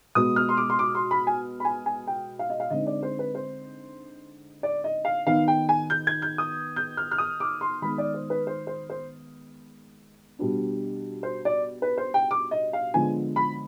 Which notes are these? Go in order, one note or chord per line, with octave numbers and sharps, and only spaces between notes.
B2 G#3 B3 D#6
F6
C6
D6
C6
D6
C6
B5
G#5
B5
G#5
G#5
G5
F5
D#5
F5
D3 G#3 C4 D#4 D#5
D5
C5
B4
C5
D5
D#5
F5
D#3 B3 D#4 F5
G5
G#5
G6
G#6
G6
D#6
G6
F6
F6
D#6
D6
C6
D#3 G#3 B3 B5
D5
C5
B4
C5
C5
C5
B2 G3 B3 D4
C5
D5
B4
C5
G5
D6
D#5
F5
D3 F3 G#3 B3 G#5
B5